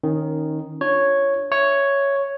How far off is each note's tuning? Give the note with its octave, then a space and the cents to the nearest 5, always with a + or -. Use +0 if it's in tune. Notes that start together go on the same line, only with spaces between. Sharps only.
D#3 +0 C#4 -20
D4 +0 F4 +0 C#5 -5
C#5 +0 E5 +0